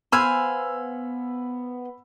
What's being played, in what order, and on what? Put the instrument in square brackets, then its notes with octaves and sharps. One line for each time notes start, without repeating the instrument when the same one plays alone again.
[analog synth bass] B3 [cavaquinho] C5 F5 G#5 [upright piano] B5 E6